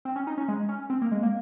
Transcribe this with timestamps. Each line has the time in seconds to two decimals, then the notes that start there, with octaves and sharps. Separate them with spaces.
0.05 C4
0.16 C#4
0.27 D#4
0.38 C#4
0.48 G#3
0.69 C#4
0.90 C4
1.02 A#3
1.11 G#3
1.23 A#3